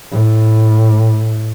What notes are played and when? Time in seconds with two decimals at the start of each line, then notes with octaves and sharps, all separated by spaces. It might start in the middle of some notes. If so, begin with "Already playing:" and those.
0.12 A2